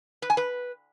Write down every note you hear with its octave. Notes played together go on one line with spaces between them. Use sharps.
B4
G#5
B4